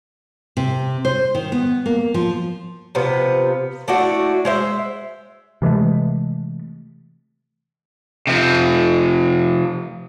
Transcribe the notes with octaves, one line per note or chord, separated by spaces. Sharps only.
C3
C5
D#3
B3
A#3
F3
C3 F3 B3
A3 D4 E4 F#4
G#3 C5 E5
C3 E3 G#3 A3
C3 F3